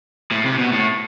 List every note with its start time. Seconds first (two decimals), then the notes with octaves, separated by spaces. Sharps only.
0.31 A2
0.45 C3
0.58 B2
0.72 A2